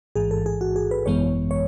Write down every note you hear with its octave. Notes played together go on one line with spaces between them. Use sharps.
A1 G#2 E3 G#4
A4
G#4
F#4
G#4
B4
G#1 F#2 E3 G#3 B3 C#5
C#5